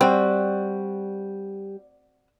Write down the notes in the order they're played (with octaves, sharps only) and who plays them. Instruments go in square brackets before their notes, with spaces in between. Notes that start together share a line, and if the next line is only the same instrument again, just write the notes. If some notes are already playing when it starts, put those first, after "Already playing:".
[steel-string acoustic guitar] G3 [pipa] C4 F#4